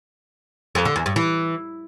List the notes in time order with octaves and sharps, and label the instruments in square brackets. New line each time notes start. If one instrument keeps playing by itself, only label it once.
[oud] F2
D3
E2
G2
E3